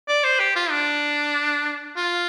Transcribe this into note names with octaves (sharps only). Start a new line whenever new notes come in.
D5
C5
G4
F4
D4
F4